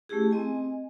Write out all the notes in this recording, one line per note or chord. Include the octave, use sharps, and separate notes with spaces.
A3 C#4 E4 G4 G#4
C4 D#5 G#5